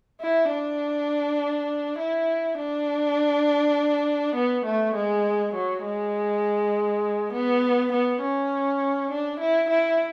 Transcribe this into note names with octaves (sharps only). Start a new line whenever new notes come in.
E4
D4
E4
D4
B3
A3
G#3
F#3
G#3
B3
B3
C#4
D4
E4
E4